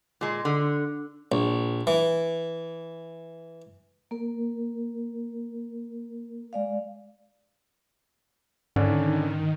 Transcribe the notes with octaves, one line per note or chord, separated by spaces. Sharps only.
A#2 G#3
D3
A#1
E3
A#3 A#4
G#3 D5 F5
G#2 D3 D#3 C#4 D4